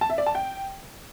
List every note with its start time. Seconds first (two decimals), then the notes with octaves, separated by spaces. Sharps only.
0.01 A5
0.10 E5
0.18 D5
0.26 A5
0.35 G5